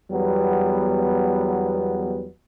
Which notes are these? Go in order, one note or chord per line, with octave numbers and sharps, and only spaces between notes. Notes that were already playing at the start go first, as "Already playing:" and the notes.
E2 F#3 G3 B3